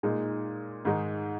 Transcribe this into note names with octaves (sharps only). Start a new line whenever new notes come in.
A#2 G#3 D#4
G#2 D#3 G#3 D#4